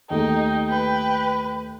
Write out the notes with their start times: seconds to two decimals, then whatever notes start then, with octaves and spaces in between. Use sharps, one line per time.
0.10 D#2 A3 D#4 G5
0.69 B4